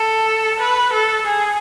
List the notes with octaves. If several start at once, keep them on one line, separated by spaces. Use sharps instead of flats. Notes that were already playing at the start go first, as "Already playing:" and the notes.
Already playing: A4
B4
A4
G#4